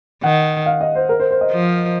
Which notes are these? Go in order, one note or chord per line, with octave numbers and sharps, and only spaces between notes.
D#3 F#5
F5
D#5
C5
A#4
C5
C5
D#5
F3